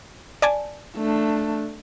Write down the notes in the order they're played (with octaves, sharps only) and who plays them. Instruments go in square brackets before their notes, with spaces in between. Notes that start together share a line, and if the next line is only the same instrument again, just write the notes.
[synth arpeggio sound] D5 G#5 A5
[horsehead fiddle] A3 D4